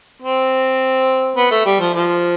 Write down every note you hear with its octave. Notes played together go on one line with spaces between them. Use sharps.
C4
B3
A3
G3
F3
F3